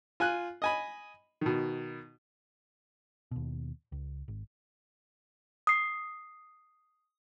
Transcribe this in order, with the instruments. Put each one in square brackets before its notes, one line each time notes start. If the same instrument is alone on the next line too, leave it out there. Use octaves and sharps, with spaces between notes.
[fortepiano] F4 G#5 F#6
D#5 G#5 B5
B2 D#3
[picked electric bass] D#2 B2
C#2
G#1
[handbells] D#6 C7